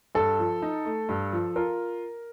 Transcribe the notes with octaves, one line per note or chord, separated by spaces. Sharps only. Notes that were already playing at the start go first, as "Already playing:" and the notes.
G2 A4
F3
D#4
A3
G2
F3
F4 A#4